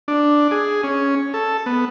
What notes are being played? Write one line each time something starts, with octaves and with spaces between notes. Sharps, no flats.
D4
G#4
C#4
A4
B3